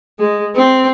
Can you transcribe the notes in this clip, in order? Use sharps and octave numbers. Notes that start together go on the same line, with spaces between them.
G#3
C4